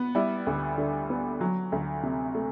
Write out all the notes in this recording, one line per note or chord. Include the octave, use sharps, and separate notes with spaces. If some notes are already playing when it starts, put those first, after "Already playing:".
Already playing: B3
G3 E4
D2
D3
B3
F#3
D2
C3
A3